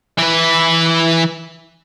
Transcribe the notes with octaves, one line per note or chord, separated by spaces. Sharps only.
E3 B4